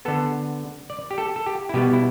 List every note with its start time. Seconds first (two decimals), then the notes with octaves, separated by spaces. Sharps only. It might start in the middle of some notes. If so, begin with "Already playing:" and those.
0.05 D3 B3 A4
0.90 D5
1.11 G4
1.18 A4
1.36 A4
1.46 G4
1.69 E4
1.74 B2 G3 B3 G4
1.93 E4